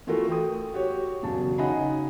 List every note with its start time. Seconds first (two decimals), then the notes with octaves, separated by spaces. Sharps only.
0.07 E3 A3 F4 F#4 A4 A#4
0.29 G5 D#6
0.74 F#4 G4 C#5
1.23 E1 F#2 C#3 F#3 A5
1.58 C#3 D#4 D#5 F#5 G#5 B5